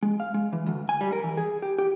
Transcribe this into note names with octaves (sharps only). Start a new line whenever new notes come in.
G#3
F5
G#3
E3
D2
G#5
G3
A#4
E3
G#4
G4
G4